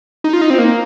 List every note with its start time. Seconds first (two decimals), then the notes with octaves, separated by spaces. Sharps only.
0.24 D#4
0.33 F4
0.41 D#4
0.50 C4
0.59 A#3